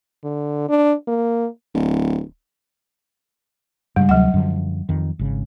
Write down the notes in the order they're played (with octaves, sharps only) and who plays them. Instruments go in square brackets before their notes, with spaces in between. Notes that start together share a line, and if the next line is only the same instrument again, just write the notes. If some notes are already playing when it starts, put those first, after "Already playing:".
[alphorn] D3
D4
A#3
[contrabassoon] D1
[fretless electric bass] G2 C#3 G#3 [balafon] G3
[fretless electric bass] D2 C3 [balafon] F#3 F#5
[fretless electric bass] F#2 D3 F3
F2 D#3
G#1 C#3